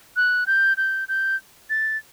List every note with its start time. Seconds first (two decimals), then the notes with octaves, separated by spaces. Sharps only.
0.16 F#6
0.47 G6
0.77 G6
1.08 G6
1.70 A6